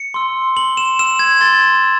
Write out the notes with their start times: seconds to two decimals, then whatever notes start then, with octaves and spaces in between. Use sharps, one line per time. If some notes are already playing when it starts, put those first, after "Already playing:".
Already playing: C#7
0.14 C6 E6
0.57 C6 F#7
0.77 E7
0.99 E6 E7
1.19 G#6
1.41 C6 A6
1.84 E6